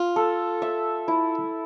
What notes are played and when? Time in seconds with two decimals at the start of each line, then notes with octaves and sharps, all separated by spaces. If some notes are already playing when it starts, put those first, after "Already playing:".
Already playing: F4
0.16 A4
0.62 E5
1.08 E4